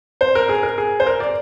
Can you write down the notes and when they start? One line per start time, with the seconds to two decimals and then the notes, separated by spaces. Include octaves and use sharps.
0.21 C5
0.35 A#4
0.49 G#4
0.63 A#4
0.78 G#4
1.00 C5
1.06 A#4
1.20 D5